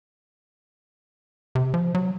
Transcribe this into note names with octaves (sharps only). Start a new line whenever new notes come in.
C3
F3
F#3